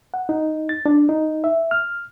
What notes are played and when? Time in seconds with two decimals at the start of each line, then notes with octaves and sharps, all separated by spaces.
0.14 F#5
0.29 D#4
0.69 A6
0.86 D4
1.09 D#4
1.44 E5
1.71 F6